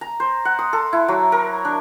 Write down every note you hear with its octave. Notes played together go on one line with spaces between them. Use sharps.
A#5
C5
F#5
D#6
A4
E4
F#3
A#4
D4